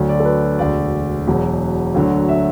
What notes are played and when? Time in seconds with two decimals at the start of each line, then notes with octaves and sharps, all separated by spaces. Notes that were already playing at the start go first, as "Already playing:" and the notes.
Already playing: D2 D3 F#3
0.09 D5
0.20 A4
0.25 B4
0.59 E1 D2 D3 D5
1.27 E1 E2 B2 F#3
1.94 D2 D3 F#3
2.29 E5